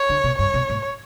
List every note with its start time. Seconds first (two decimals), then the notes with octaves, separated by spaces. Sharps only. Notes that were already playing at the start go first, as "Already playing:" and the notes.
Already playing: C#5
0.09 D3
0.24 B2
0.39 G2 C#5
0.54 B2
0.70 A2